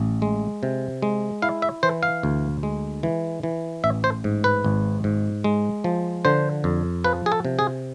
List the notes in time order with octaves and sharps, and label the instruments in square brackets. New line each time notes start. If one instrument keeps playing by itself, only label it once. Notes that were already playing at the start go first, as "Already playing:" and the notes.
Already playing: [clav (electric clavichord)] A1
G#3
C3
G#3
E4 F5
E5
E3 C5
F5
D2
G#3
E3
E3
A1 E5
C5
G#2
B4
G#1
G#2
G#3
F3
D3 C5
F2
F3 B4
G#4
A4
C3
G#4